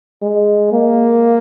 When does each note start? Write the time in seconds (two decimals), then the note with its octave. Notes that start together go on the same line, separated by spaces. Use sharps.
0.22 G#3
0.72 A#3